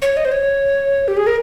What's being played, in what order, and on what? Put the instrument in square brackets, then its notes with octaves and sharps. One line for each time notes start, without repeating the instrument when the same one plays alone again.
[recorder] C#5
D#5
C5
C#5
G4
G#4
A#4